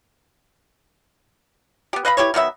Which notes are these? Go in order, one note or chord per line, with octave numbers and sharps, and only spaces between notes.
B3 G4
B4 D#5 F5 B5
E4 G4 B4 C#5
D#3 F#3 B3 E5